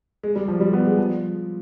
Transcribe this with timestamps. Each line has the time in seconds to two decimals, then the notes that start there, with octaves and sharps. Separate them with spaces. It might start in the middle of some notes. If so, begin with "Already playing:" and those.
0.23 G#3
0.36 G3
0.48 F3
0.60 G3
0.73 B3
0.86 G#3
0.98 F3